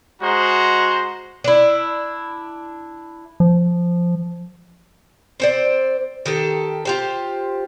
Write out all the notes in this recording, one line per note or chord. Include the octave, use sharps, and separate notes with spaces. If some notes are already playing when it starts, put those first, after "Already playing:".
G#3 F#4 C5 A#5
D4 E4
F3
C4 C5 D5
D#3 G4 A4
F4 G4 C5